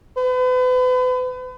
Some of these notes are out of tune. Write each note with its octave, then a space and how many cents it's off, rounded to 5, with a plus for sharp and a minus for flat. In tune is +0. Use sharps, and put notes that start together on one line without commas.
B4 +40